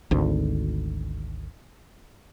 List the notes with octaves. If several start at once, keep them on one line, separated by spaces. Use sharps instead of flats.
G#1 D2